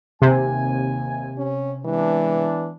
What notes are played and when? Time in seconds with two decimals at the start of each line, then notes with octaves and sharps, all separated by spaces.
0.22 D#2 C3 G#5
1.37 C#4
1.85 E3 G#3 B3 D4